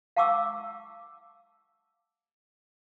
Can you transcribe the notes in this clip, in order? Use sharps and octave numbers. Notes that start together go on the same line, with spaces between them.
F5 F#5 A5 C#6 D6 E6